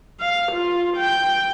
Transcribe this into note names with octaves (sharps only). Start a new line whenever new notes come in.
F5
F4
G5